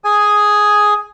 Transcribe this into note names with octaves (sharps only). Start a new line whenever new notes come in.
G#4 G#5